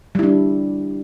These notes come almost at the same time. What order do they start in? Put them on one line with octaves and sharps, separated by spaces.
G3 E4 D4